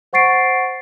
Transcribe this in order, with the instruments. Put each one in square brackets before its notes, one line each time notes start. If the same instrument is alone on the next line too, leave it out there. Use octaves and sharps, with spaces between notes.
[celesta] C5 F#5 C#6 A6 C7 D7